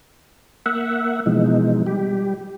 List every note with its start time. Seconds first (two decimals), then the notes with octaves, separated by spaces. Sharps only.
0.66 A#3 E5 F#5
1.26 B2 E3 F3 G#3 D#4
1.87 G3 G4